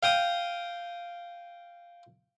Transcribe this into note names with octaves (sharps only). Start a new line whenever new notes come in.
F5 G5 D#6